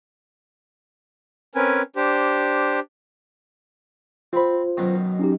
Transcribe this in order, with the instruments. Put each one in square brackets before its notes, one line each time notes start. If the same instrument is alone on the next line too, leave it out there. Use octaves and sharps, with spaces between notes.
[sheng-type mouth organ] C4 C#4 A#4 B4 G#5
D4 G4 C5
[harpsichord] C4 B5 [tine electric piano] F4 C5
[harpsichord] F#2 B2 D#3
[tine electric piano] C#4 D#4 G4